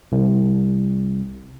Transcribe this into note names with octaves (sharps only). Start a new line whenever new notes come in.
C2